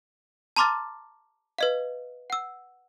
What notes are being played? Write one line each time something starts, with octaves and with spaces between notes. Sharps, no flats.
A5 A#5 C6 D6 F6 A6
B4 D#5 F5
F#5 E6